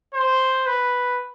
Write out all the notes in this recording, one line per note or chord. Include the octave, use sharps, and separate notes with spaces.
C5
B4